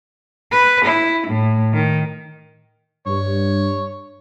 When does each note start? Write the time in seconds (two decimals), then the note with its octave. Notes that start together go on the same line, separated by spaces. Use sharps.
0.51 B4
0.85 E4
1.28 A2
1.73 D#3
3.07 G2 C#5